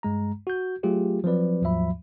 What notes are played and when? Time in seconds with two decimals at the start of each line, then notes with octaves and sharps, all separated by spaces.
0.03 G2 G#3 A#5
0.47 F#4 G6
0.83 F#3 A3 F4 G4 G#4
1.24 F3 F#3 C4 B4 D5
1.62 D#2 G#2 F3 F#3 E5 B5